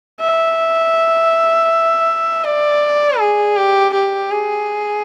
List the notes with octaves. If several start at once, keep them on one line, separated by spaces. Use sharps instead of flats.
E5
D5
G#4
G4
G4
G#4